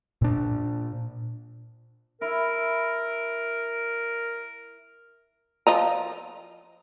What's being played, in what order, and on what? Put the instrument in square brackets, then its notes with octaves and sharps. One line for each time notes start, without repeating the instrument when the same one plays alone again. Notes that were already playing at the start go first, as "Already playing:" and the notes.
[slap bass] A#2 D4
[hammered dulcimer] E4 [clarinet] A#4
[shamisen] F3 D#5 A#5